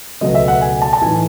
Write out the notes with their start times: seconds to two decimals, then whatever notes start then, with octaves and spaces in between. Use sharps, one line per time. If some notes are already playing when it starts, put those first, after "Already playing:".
0.21 C#2 B2 F#3 A3 D#5
0.35 E5
0.48 F#5
0.61 G#5
0.82 A5
0.93 A5
1.02 A2 E3 A3 D#4 G#5